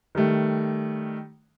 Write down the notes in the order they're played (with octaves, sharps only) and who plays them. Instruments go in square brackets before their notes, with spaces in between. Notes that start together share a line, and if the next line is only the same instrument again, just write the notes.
[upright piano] D#3 G3 A3